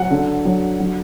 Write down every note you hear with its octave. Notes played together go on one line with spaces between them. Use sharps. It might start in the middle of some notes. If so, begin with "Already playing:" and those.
Already playing: F#3 F#5
D3
F#3
F#3